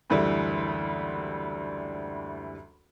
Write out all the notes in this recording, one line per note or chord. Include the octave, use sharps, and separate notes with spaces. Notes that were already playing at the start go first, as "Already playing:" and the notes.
F#1 D2 E3 G3